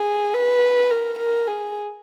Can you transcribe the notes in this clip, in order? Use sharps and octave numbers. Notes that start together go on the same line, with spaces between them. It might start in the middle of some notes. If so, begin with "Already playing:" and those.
Already playing: G#4
B4
A#4
A#4
G#4